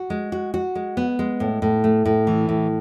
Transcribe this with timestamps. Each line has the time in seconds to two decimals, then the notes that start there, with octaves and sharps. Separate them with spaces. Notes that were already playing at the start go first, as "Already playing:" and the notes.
Already playing: F#4
0.10 G#3
0.32 F#4
0.54 F#4
0.75 G#3
0.97 B3
1.19 G#3
1.40 A2
1.62 A2
1.84 A3
2.05 A2
2.27 E3
2.49 A2